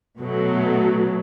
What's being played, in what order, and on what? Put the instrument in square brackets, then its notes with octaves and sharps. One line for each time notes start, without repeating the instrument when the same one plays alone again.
[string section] B2 F#3 A3